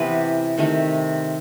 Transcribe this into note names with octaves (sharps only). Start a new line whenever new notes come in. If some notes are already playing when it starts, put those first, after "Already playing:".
Already playing: C3 E3 B3 B4
C3 D#3 A3